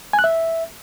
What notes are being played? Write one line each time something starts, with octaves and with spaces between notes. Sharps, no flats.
G#5
F#6
E5